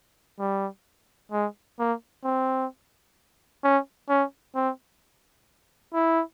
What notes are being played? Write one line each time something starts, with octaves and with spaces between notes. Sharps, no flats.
G3
G#3
A#3
C4
C#4
C#4
C4
E4